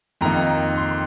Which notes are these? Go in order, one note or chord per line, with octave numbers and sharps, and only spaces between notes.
F2 D#3 A#3 D#4 A#5
C6